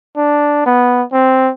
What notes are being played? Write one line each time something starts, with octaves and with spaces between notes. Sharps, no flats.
D4
B3
C4